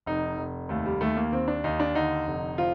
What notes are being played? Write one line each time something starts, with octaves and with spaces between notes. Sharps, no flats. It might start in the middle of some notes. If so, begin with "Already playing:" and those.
F1 D#4
F1
D#2 A3
G3
D#2 A3
A#3
D#2 C4
D4
D#2 D#4
D4
D3 D#4
F1
F3 F4